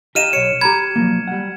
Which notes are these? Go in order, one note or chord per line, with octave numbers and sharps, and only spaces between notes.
G4 D#5 F5 F6 D#7 E7
B1 C#5 C#7
G4 A#5 B5 G#6
F3 F#3 A#3
G3 F#5